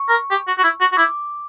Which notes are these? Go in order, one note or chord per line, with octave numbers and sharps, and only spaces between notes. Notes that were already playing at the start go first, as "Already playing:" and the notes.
Already playing: C#6
A#4
G4
F#4
F#4
E4
F#4
F#4
E4 D6